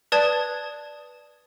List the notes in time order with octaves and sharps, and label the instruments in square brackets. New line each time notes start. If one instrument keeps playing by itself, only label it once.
[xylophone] B4 D5 A5 D#6 G#6 A6